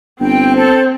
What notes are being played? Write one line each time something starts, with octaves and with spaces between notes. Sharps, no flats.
G1 C4 G5
A4 C5